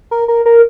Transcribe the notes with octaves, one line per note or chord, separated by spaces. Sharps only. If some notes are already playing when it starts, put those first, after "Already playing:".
A#4
A#4
A#4